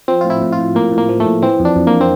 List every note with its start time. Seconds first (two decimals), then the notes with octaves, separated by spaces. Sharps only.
0.08 F3 C4
0.21 A2 F4
0.30 E4
0.42 A2
0.52 F4
0.59 A2
0.75 A2 A#3
0.92 A2
0.98 A#3
1.09 F3
1.20 A3
1.26 A2
1.42 E3 C4
1.60 F2
1.65 D4
1.76 F2
1.87 A#3
2.01 C4